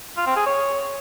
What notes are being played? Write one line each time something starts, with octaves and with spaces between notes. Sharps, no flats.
F4
C4
G#4
C#5